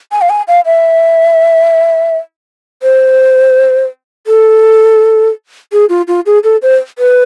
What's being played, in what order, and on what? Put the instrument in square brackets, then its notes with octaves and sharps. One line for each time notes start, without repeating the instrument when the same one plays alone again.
[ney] G#5
F5
G#5
F5
E5
C5
A4
G#4
F4
F4
G#4
A4
C5
B4